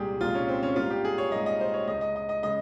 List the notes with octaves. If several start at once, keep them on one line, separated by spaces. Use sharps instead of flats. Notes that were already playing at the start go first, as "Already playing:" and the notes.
Already playing: C2 A#2 G#3 G4 G#4
C2 A#2 G#3 F4
C#4
C4
C#4
G#2 G3 A#3 F4
G4
G#4
C#5
G#2 G3 A#3 D#5
D#5
C5
C#5
C#2 C#3 G#3 D#5
D#5
D#5
D#5
C#3 G#3 D#5